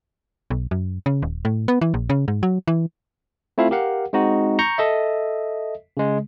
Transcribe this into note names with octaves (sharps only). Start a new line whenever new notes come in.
B1
F#2
C#3
D#1
A2
B3
E3
A#1
C#3
G#2
F#3
E3
A3 C4 E4 F4 A4 F5
G4 A#4 F5 F#5
G#3 C4 D#4 F#4
A#5 C#6 G6 A#6 C#7
A4 D#5 E5
C#3 G#3